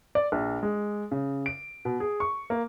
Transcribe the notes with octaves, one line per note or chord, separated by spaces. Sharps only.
D5
A#1
G#3
C#3
D7
B2
G#4
C#6
A#3